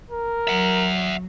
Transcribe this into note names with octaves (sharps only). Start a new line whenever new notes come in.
A#4
F#3 E5 F#5